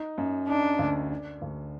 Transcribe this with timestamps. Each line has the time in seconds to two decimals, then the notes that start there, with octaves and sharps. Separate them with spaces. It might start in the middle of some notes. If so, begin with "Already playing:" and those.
Already playing: D#4
0.18 F#2
0.48 D4 D#4
0.79 D2
1.11 D4
1.42 D2